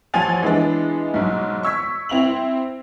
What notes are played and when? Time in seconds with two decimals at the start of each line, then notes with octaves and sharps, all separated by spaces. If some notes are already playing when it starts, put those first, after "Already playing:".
0.14 A1 F3 G#5 A6 F7
0.42 E3 G#3 B3 D4
1.14 B1 G#2
1.63 C#6 E6 G#6 B6
2.09 C4 E4 F7 F#7